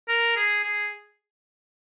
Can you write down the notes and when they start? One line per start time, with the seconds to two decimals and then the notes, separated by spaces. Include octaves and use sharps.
0.08 A#4
0.36 G#4
0.64 G#4